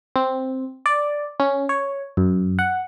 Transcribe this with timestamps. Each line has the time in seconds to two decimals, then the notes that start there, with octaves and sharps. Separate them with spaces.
0.16 C4
0.86 D5
1.40 C#4
1.69 C#5
2.17 F#2
2.59 F#5